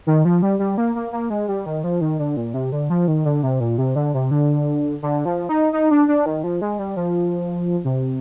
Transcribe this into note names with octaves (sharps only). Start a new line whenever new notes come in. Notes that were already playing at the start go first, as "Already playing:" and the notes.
D#3
F3
G3
G3
A#3
A#3
A#3
G#3
G3
D#3
F3
D#3
D3
A#2
C3
D3
F3
D#3
D3
C3
A#2
C3
D3
C3
D3
D3
F3
D#4
D#4
D4
D4
D#3
F3
G#3
G3
F3
C3